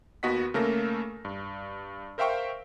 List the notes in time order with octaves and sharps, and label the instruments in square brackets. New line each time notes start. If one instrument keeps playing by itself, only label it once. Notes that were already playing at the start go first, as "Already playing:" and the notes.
[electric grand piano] D#2 B3 F#4 D#5 F#5 B6
C#3 A3 A#3 A4 A#4 A#6
G2
A#4 C5 E5 F5 G5 C#6